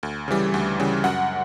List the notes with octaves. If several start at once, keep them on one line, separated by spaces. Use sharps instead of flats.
D2
C#3 E3 G3
D2
C#3 E3 G3
F#2 F#5